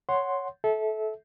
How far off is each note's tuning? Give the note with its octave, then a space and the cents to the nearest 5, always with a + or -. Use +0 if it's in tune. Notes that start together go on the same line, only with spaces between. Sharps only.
C#5 +0 F#5 +0 C6 +0
A4 -20 E5 -25